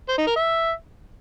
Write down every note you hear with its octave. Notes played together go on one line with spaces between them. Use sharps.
C5
D#4
A#4
E5